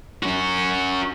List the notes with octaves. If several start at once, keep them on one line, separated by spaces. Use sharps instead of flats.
C#4 F#4